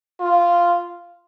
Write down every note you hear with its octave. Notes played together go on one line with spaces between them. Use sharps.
F4